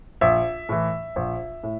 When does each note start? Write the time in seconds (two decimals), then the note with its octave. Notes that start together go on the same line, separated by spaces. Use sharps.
0.21 A#1 E5
0.69 A2 E3
1.16 A#1
1.63 A2